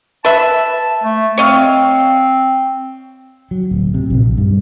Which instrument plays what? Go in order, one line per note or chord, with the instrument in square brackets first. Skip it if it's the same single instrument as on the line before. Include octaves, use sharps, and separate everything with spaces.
[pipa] B4 E5 [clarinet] A5
[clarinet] A3
[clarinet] C4 [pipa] C#5 D#5 F5
[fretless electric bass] F#3
D1
C3
A#1
G2